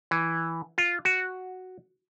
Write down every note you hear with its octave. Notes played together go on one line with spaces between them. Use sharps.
E3
F4
F#4